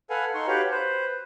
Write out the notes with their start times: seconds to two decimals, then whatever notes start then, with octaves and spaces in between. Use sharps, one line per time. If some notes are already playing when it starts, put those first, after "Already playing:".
0.10 A4 B4 F5 F#5 G#5
0.35 D#4 A4 C6 C#6
0.47 F#4 G4 B4 C#5 F5
0.71 B4 C5